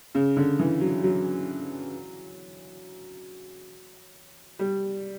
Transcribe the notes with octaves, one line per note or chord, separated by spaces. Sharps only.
C#3
D3
E3
F#3
F#3
G3